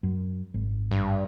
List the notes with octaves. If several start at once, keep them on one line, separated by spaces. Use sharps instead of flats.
F#2
G#1
G2